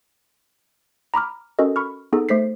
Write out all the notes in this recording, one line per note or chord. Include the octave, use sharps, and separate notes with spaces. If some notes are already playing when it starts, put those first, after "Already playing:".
A#5 B5 D6 F6
C#4 F#4 A4 A#4 D#5
B5 C#6 F6
B3 D#4 G#4 A4
A3 C5 B6 C7